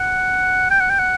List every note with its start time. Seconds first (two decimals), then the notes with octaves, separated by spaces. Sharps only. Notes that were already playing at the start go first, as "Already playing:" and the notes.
Already playing: F#5
0.70 G5
0.80 F#5
0.90 G5
0.99 F#5